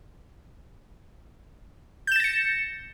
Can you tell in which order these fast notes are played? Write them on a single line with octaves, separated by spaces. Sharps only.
G6 E7 A6 A#6 C#7